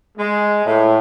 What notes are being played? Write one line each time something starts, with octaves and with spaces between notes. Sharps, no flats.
G#3
A2